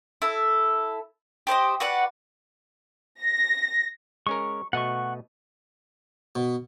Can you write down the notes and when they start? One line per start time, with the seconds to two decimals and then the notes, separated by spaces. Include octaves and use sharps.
0.22 E4 A4
1.47 G4 C5 D5 D#5
1.80 F#4 B4 D5 F#5
3.22 A#6
4.27 G#3 C#4 A#4 C#6
4.73 B2 A3 D#5 F#5 C#6
6.36 B2